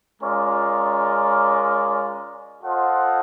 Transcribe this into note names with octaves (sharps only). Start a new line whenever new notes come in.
G#3 C#4 F4 A#4 D5
F4 A4 C5 D#5 F#5